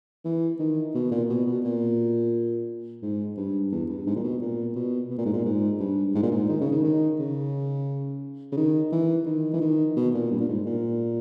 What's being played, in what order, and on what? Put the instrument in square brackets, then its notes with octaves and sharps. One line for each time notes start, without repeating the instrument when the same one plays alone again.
[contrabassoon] E3
D#3
B2
A#2
B2
B2
A#2
G#2
G2
E2
G2
G#2
A#2
B2
A#2
B2
B2
A#2
G#2
A#2
G#2
G2
G#2
A#2
G#2
D#3
C#3
D#3
D#3
C#3
C#3
D#3
E3
D#3
E3
D#3
B2
A#2
G2
A#2
G#2
A#2